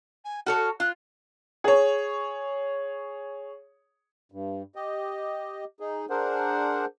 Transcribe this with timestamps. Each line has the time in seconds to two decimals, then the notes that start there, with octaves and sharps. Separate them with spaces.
0.25 G#5
0.46 F#4 A4 C#5 F6
0.80 F4 F#6
1.64 G#4 C#5
4.32 G2
4.75 G4 D#5
5.80 D#4 G#4
6.10 D4 G#4 A#4 C5 F#5